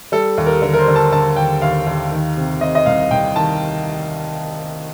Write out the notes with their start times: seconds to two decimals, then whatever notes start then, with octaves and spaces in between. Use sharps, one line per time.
0.12 G3 A4
0.38 D#2
0.46 A#4
0.62 D3 A#4
0.74 A#4
0.79 C5
0.88 D3
0.96 A5
1.12 D3 A5
1.36 D#2 G5
1.62 D#2 F5
1.87 D#2
2.12 D#3
2.37 C3
2.61 C3 D#5
2.75 D#5
2.86 C2 F5
3.11 C2 G5
3.36 D#3 A5